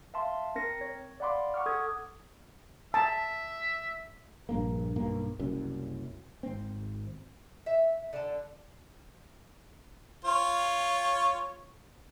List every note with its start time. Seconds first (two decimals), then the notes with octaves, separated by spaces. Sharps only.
0.14 E5 F5 A5 C6
0.56 C4 A#4 A#6 C#7
0.81 C#5
1.20 D5 F5 F#5 B5 C6 D6
1.54 F#5 C#6 D6 F6
1.66 A4 D#6 G#6
2.94 E5 A5
4.49 A#1 G2 A#3
4.96 B1 G2 A#3
5.39 F#1 C2 F#2
6.43 G#1 C4
7.66 E5
8.13 D3 A5
10.25 F4 C#5